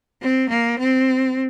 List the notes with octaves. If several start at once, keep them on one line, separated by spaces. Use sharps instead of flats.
C4
A#3
C4